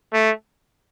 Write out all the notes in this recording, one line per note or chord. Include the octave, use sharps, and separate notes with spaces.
A3